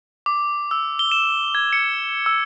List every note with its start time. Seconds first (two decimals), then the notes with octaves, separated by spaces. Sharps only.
0.26 D6
0.71 E6
0.99 G7
1.11 E7
1.55 G#6
1.73 C#7
2.26 E6